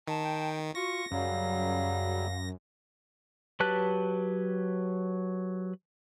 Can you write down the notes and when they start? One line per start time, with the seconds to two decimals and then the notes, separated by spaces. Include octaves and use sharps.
0.08 D#3 A5
0.24 G5
0.75 F4 F#4 C#6 A#6
1.12 F#2 C#3 F#3 G3 F5
3.60 F#3 G4 B4 A5 F#6